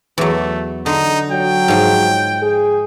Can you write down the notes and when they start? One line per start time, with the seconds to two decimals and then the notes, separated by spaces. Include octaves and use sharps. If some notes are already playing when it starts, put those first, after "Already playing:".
0.18 E2 F#3 A3
0.86 D3 D#4
1.31 F#3 G5
1.68 G#2 F3
2.43 G#4